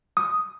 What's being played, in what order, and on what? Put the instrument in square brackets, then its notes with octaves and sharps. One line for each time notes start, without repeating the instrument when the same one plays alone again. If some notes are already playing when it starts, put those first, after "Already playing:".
[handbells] D#6